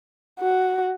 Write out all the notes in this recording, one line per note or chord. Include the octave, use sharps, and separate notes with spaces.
F#4